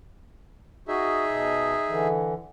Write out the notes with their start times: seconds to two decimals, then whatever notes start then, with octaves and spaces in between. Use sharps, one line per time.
0.88 D#4 F#4 G#4 E5
1.26 B2
1.88 D3 E3